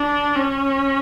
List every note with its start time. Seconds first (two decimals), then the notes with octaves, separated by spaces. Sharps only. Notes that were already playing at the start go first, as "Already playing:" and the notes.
Already playing: D4
0.36 C#4